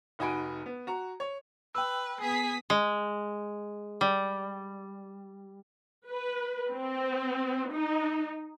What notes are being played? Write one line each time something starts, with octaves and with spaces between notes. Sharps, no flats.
F1 D#4 F#4 G#5 B5 D7
B3
F#4 A#5
C#5
B4 G5 E6
B3 G#4 D#6 B6
G#3
G3
B4
C4
D#4